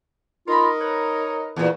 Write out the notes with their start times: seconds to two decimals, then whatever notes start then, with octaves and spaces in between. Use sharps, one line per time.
0.48 D#4 F4 A#4 B5 C6
0.81 B4 C#5
1.56 E2 A#2